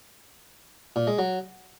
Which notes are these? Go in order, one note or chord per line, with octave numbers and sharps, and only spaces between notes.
A#2
G#3
F#3